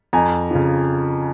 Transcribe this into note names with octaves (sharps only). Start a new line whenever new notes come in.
F2 G#5 A#5
C#3 F3